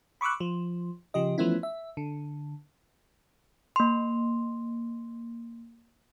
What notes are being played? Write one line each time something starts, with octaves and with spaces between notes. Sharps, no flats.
B5 C#6 D6 E6 F#6
F3
C#3 F3 G4 D#5
E3 F3 A3 B3 C#4 E4
E5
D3
A#3 C6